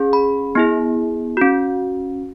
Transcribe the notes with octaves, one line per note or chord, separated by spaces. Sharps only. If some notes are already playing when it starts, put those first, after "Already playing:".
Already playing: C#4 G#4
B5
B3 E4 G#4
C#4 F#4